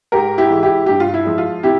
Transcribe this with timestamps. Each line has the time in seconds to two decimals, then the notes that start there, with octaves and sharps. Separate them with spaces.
0.12 G#2 G4 A#4
0.38 E4 G4
0.50 E3 G#3
0.63 E4 G4
0.86 G2 G4
1.00 F4
1.14 E4
1.26 F3 G#3
1.38 F4
1.63 C3 E4 G4